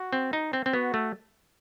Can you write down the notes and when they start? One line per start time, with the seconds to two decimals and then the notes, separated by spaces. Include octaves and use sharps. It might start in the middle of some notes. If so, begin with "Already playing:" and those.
Already playing: F#4
0.13 C4
0.33 D#4
0.53 C4
0.66 C4
0.73 B3 F#4
0.94 A3